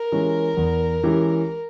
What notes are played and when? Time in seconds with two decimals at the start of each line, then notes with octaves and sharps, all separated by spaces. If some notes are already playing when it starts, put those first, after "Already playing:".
Already playing: A#4
0.12 E3 G#3 C#4 G4
0.57 E2
1.03 E3 G#3 C#4 G4